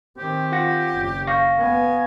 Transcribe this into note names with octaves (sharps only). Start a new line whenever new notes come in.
D#3 C4 G4
F4 F#5 A#6
F#1
F5 C#6 A#6
B3 G#5